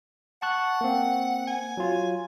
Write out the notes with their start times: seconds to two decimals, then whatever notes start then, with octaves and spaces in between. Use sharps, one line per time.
0.42 F#5 A5 C#6 F#6
0.81 A#3 C4
1.47 G#5
1.77 F#3 F4